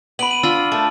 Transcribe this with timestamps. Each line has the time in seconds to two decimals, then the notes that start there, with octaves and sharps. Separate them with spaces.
0.19 B3 B5 D7 F#7
0.31 D#7
0.43 D4 F4 B5 E6
0.72 A3 A4 A#4